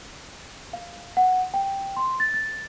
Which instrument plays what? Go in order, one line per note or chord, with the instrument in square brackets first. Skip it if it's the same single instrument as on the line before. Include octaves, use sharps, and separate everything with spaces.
[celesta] F5
F#5
G5
C6
A6
A6